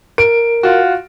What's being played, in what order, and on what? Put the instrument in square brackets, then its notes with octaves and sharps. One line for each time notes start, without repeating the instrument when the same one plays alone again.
[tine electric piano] A#4 [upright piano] D7
[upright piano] F4 F#4